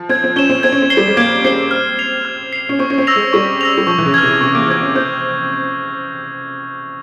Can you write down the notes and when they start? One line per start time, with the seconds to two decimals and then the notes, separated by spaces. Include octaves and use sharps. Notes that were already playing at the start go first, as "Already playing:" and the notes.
Already playing: F3
0.09 C4 G#6
0.24 C4
0.36 C#4 E7 G7
0.50 C4
0.63 C4 G#6
0.72 C#4
0.82 C4
0.90 C7 G7
0.97 G3
1.07 G#3
1.17 A#3 G#6
1.44 C4 C7 G7
1.71 F6
1.99 C7 F7
2.25 F6
2.53 C7 F7
2.69 C#4
2.79 C4 C#6
2.90 C#4
2.98 C4
3.07 E6 A#6 F7
3.16 G#3
3.33 G3 C#6
3.61 E6 A#6 F7
3.78 G3
3.87 F3 C#6
3.98 E3
4.06 C#3
4.14 F6 G#6
4.23 C3
4.41 C3 C#6
4.55 A#3
4.68 C4 F6 G#6
4.82 C#4
4.95 C4 G6